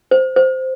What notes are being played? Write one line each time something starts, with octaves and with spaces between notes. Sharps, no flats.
C5
C5